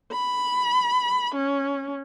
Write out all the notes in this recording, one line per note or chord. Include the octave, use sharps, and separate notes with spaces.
B5
C#4